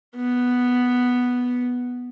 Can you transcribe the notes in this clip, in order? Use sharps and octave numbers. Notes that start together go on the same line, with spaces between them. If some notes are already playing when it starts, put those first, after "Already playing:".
B3